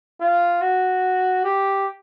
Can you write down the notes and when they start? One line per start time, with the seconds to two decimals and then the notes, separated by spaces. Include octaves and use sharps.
0.21 F4
0.62 F#4
1.44 G4